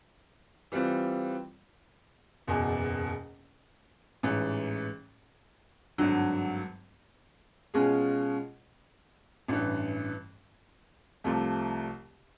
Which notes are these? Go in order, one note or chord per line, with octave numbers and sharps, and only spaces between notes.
E3 G3 C4 F4
F#1 E2 B2
A1 G#2 E3
G#1 G2 D3 F#3
B2 G#3 C#4 F4 G#4
A1 G2 E3
C2 C3 F3 A3